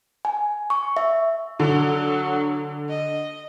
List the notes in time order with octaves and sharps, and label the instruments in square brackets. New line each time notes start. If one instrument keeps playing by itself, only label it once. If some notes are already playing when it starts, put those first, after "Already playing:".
[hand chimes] G#5
C#6
E5
[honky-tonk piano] D3 [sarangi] F#3
[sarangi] D#5